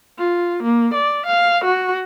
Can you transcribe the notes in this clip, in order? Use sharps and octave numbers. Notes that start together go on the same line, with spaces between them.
F4
A#3
D5
F5
F#4